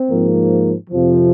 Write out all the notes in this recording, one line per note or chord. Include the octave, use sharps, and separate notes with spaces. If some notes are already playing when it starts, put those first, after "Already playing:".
Already playing: C4
G#2 F3 A#3
F2 C3 F3